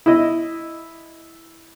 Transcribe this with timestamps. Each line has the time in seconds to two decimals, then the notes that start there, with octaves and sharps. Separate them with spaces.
0.06 E4 D#5